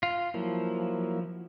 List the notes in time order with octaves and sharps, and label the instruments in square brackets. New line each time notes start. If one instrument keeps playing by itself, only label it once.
[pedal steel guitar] F4
[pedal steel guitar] F3 [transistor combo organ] F#3 A#3 E4